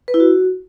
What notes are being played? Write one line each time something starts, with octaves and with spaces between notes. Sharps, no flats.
B4
E4
F#4